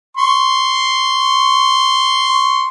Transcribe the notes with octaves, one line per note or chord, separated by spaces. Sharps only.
C6 C#6